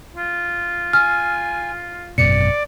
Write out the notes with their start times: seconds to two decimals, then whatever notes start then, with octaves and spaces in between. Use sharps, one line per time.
0.16 F4
0.93 G#5 F6
2.18 G#1 F#2 B2 D5 C#7